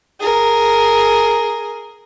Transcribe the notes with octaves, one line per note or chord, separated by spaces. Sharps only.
G#4 A#4